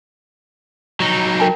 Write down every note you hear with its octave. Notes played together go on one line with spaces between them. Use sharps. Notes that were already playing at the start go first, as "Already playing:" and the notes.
F#3 D#4
A#4 G5 A5